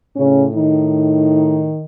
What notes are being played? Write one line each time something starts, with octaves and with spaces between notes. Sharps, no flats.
A2 C#3 C#4
D#3 D#4